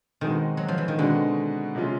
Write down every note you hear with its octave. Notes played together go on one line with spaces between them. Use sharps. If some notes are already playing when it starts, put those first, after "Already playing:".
B2 D#3 G#3 C4 D#4 F#4
F#3
F3
E3
D#3
B2 D3 G#3 C4 D#4 F#4
C3 F3 G#3 C#4 F4